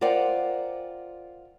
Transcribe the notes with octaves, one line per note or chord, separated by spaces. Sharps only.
F4 A#4 C5 D5 F#5 G5